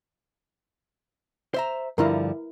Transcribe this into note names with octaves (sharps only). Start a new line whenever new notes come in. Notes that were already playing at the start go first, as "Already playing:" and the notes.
C5 E5 A#5
G2 D3 F3 E4 A#4